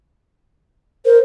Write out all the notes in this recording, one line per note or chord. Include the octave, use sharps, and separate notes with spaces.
A#4 C5